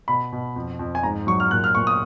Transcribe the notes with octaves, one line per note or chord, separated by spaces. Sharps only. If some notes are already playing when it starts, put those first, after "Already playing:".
B2 B5
B2
F2
F2
G#5
G#2 A#5
F#3 C#6
F6
A#2 F#6
F6
A#2 C#6
D#6